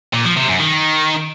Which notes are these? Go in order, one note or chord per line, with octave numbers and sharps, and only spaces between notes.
A#2
F3
C3
F#2
D#3